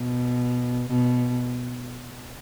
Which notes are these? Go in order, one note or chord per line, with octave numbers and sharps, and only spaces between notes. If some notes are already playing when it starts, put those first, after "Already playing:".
Already playing: B2
B2